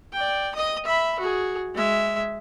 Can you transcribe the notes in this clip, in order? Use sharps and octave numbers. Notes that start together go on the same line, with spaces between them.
D5 G5
D#5 D#6
E5 B5
F#4 G#4
G#3 E5